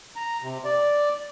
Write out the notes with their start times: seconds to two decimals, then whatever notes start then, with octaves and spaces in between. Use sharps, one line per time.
0.16 A#5
0.42 C3
0.64 D5